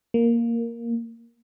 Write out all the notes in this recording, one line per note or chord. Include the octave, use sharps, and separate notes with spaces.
A#3